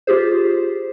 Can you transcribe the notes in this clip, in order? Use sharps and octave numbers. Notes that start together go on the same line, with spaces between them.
F4 G4 G#4 C5